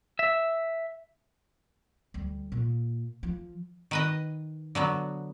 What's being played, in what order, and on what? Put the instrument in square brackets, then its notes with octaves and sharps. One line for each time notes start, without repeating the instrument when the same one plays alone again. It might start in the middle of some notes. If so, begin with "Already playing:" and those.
[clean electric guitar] E5
[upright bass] D2 G3
A#2
F3
[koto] D#3 B4 D#5
D3 F#3 B3